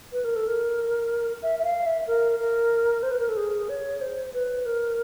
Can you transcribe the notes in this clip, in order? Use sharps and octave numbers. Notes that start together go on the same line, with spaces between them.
B4
A#4
A4
A#4
E5
E5
F5
E5
A#4
A#4
C5
B4
A#4
A4
G#4
C#5
C5
B4
A#4